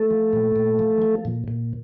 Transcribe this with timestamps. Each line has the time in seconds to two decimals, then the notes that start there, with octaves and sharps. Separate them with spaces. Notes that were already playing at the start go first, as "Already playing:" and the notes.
Already playing: A3 A4
0.11 F3
0.33 A#2
0.56 A#2
0.79 F3
1.02 F3
1.25 A#2
1.48 A#2